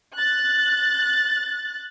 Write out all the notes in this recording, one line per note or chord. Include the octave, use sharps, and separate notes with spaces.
F#6 A6